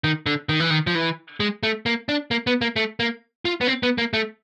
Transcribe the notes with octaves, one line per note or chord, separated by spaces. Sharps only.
D#3
D3
D#3
E3
D#3
F3
E3
G#3
A3
A#3
D4
A#3
B3
A#3
A3
A#3
F4
B3
C4
B3
A#3
A3